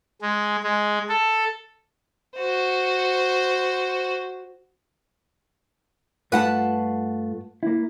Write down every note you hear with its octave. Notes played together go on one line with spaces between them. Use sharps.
G#3
G#3
A4
F#4 C5
G2 A3 F4 B4 F#5 A5
A#3 E4